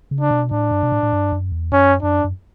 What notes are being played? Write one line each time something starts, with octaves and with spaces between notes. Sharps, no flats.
C#3
D4
B2
A2 D4
G2
B2
A2
A2
G2
F#2
E2
F#2 C#4
F#2 D4
F#2